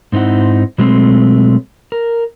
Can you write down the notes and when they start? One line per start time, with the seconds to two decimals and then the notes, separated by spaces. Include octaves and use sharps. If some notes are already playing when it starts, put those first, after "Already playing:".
0.12 G#2 C4 D#4 E4 F#5
0.78 B2 F#3 G#3 A3 B3 C4
1.92 A#4